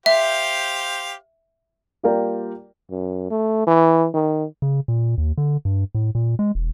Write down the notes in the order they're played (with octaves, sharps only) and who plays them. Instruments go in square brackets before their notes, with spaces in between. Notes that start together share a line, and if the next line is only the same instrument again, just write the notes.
[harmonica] G4 C5 F5 [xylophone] E5
[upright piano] G3 A#3 F4 A#4 D5 G5
[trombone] F#2
A3
E3
D#3
[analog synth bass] C#3
A#2
D#2
D3
G2
A2
A#2
G#3
E1